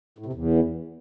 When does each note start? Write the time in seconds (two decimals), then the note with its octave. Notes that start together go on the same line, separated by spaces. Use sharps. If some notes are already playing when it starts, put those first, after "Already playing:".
0.18 A2
0.26 C3
0.33 E2